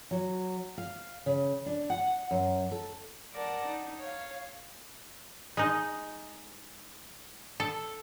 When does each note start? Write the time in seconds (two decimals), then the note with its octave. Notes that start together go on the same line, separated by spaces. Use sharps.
0.11 F#3
0.78 F5
1.26 C#3
1.66 D4
1.90 F#5
2.31 F#2
2.71 A4
3.33 A#4 D5 F#5 A5
3.66 D#4
4.00 C#5 F5
5.57 G#3 D#4
7.60 A4